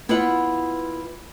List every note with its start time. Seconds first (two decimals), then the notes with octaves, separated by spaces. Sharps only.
0.09 B3 E4 F4 B4 E5 F#5